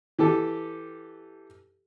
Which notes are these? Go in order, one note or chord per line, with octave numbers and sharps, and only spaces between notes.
E3 G4 A4